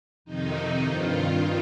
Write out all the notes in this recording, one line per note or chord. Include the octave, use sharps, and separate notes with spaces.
F2 C3 D#3 D#4
G2 D#3 F4